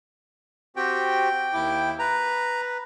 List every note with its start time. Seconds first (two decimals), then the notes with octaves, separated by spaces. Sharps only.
0.76 C4 F#4 G4 G5
1.54 D#2 E4 D6
1.99 B4 A#5